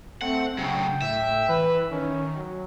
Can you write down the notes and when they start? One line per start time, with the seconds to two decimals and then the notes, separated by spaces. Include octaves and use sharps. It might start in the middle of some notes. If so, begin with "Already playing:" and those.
0.21 A3 C4 F#5
0.58 A2 C#3 F#3 G5
1.02 A2 E5
1.49 E3 B4
1.91 D#3 C#4
2.36 F#3